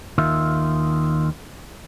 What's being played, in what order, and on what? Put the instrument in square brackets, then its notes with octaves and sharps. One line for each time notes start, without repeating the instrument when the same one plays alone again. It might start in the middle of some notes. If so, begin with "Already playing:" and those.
[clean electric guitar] D#2 D#3 F4 E5